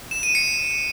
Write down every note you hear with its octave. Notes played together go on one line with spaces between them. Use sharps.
E7
D#7
C#7